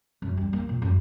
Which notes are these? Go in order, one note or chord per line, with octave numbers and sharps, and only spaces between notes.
F#2
G3
A#3
A#2
F#2